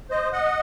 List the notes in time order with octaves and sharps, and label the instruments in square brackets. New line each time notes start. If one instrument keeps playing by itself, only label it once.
[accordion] C5 D#5
D#5 F#5